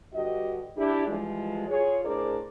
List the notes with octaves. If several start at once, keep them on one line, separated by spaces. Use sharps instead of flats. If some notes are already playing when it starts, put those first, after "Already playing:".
G2 D3 F#4 G4 D#5
D4 E4 G4
E3 F3 G3 G#3
F4 G#4 C#5
A2 D4 G#4 A#4 C5 D5